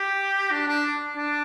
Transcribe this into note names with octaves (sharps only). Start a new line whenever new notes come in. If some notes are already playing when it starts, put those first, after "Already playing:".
Already playing: G4
D4
D4
D4